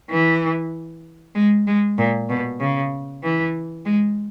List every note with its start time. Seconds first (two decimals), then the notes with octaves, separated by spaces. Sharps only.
0.10 E3
1.35 G#3
1.67 G#3
1.98 A#2
2.29 B2
2.60 C#3
3.23 E3
3.86 G#3